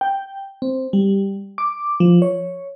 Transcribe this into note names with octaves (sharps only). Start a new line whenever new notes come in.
G5
C4
G3
D6
F3
C#5